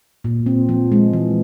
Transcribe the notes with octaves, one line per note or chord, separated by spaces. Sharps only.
A#2
C4
F3
G#3
E3